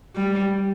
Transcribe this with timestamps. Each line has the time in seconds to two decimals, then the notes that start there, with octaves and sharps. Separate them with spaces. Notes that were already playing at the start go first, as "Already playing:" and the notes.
0.16 G3